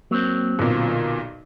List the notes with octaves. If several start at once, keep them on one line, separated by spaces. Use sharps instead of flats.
F#3 A#3 C4
B1 A#2 D3 B3 F4 D6